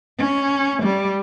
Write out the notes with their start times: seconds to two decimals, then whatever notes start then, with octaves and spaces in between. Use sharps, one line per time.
0.18 C#4
0.82 G3